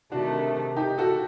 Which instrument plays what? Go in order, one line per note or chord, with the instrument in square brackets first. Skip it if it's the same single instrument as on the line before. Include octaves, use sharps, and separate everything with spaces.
[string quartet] C3 D#3 A3 [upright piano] D4 F#4
[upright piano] D#4 G4
F#4 A4